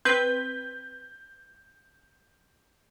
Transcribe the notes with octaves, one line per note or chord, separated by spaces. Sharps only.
C4 B4 G6 B6